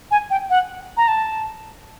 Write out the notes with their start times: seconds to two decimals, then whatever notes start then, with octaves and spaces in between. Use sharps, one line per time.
0.11 G#5
0.30 G5
0.50 F#5
0.97 A#5
1.08 A5